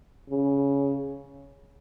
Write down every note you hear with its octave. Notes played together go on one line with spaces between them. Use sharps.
C#3